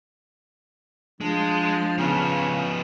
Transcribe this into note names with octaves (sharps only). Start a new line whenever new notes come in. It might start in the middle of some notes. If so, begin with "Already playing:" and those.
F3 G#3 D4
C#3 F3 B3